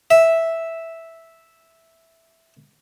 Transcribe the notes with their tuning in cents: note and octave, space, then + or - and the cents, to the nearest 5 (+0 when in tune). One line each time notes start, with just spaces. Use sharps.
E5 -5